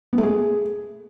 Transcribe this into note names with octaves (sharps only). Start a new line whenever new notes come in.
B3
A3
G#4